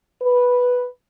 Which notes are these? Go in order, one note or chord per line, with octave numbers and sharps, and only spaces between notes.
B4